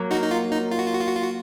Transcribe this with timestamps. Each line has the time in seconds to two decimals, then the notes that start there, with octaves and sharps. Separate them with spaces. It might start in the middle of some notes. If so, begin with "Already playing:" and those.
Already playing: F#3 A#3
0.11 D#4 F#4
0.22 D#4
0.31 F4
0.52 D#4
0.71 F4
0.79 F#4
0.86 F4
0.93 F#4
1.00 F4
1.08 F#4
1.16 F4
1.22 F#4